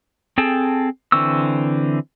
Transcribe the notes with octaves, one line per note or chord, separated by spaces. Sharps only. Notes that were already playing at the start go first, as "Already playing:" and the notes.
C4 G#4 A4 G5 A5
D3 E3 C4 C#6 E6